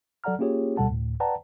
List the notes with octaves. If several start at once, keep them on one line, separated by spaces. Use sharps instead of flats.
F#3 A4 D5 F#5 A#5 F6
A#3 C#4 F4 G4 G#4 C#5
D2 B2 G3 A4 F#5 A5
D2 A2
B4 D5 F#5 G5 A5 A#5